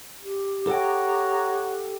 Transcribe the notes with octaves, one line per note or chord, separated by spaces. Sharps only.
G4
A4 C#5 F#5 G5 A#5